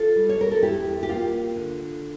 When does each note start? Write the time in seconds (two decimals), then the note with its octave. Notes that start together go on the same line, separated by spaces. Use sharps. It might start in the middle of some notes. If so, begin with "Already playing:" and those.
Already playing: F4 A4
0.16 G3
0.29 C#5
0.41 A#4
0.51 A4
0.63 E2 E4 G4
1.03 G4
1.09 A#3 F4
1.56 D3